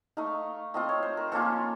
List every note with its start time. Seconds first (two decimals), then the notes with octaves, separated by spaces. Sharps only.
0.17 A3 D#4 F5
0.74 A3 C4 F4 D#5
0.89 C#5
1.03 C5
1.17 A#4
1.32 F3 A#3 C#4 F4 A4